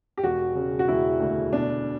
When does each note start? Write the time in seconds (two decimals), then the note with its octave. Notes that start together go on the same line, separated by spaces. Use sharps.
0.17 G4
0.23 E1 F#4
0.55 C#3
0.79 F#4
0.88 E1 E4
1.20 D2
1.53 B2 D4